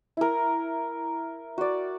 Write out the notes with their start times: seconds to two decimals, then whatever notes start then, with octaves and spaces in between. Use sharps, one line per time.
0.17 E4 A#4
1.58 F#4 D5